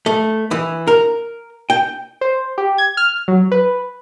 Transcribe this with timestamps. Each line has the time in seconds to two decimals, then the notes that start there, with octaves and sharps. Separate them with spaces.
0.06 A3
0.51 E3
0.87 A#4
1.70 G5
2.21 C5
2.58 G4
2.78 G#6
2.97 F6
3.28 F#3
3.52 B4